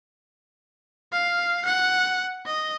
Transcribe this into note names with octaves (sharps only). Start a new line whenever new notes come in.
F5
F#5
D#5